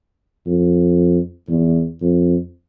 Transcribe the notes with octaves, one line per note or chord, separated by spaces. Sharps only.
F2
E2
F2